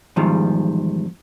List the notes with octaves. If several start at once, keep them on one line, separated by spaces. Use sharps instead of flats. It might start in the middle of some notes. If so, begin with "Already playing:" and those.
E2 G#2 D#3 F3 G3